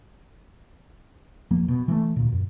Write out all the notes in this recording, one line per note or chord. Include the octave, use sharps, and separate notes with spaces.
F1 F3 A#3
B2
E3 F#3 A3
D2 A#2
F#2